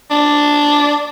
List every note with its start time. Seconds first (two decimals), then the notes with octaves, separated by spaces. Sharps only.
0.11 D4